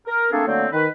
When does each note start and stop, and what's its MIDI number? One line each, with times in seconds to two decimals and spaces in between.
0.07 0.31 70
0.32 0.46 57
0.32 0.46 58
0.32 0.46 60
0.32 0.46 62
0.32 0.46 68
0.32 0.46 69
0.47 0.67 50
0.47 0.67 54
0.47 0.67 57
0.47 0.67 58
0.47 0.67 60
0.72 0.87 51
0.72 0.87 71